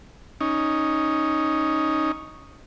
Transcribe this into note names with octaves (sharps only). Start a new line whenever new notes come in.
C#4 D#4